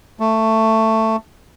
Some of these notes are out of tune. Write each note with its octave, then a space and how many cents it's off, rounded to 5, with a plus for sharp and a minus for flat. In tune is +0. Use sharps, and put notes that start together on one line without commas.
A3 +10